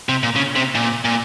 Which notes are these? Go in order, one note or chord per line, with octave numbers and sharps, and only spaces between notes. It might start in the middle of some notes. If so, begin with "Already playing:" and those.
C3
A#2
C#3
C3
A#2
A#2